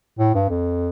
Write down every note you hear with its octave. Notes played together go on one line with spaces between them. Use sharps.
A2
G2
F2